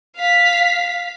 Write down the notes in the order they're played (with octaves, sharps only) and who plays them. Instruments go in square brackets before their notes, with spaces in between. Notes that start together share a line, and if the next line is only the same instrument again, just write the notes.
[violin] F5 B6